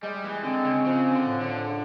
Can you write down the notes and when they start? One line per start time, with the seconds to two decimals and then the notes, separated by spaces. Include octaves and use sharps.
0.03 G3 G#3
0.24 E3
0.44 D3 C4
0.65 C#3
0.85 C#3 F3
1.12 D3
1.26 A2
1.40 D3
1.67 C#3